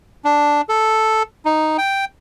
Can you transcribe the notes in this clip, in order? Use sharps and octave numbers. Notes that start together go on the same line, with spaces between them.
D4
A4
D#4
G5